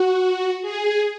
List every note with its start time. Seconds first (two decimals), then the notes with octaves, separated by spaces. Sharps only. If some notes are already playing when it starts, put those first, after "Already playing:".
Already playing: F#4
0.62 G#4